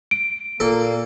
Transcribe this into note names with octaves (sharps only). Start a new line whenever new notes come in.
D7
A#2 A#3 A4